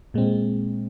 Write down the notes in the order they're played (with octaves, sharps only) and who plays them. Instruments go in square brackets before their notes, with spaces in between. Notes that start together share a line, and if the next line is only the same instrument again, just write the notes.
[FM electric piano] A#2 G#3 C4